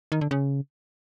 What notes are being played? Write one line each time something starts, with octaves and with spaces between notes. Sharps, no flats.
D#3
D3
C#3